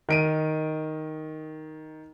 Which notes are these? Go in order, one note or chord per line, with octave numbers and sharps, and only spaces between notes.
D#3 D7 D#7